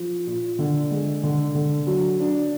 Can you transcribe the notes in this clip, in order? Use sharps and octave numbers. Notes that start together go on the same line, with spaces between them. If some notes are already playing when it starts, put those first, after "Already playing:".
Already playing: F3
A#2
D3
G#3
D3
D3
F#3
D4